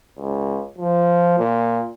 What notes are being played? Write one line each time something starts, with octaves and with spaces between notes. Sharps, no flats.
C#2
F3
A#2